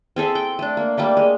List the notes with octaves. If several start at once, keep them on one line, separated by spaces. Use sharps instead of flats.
C4 G#4 A4 E5
G5
A3 D4
A#3
G3 A3 A#3 G4
G#3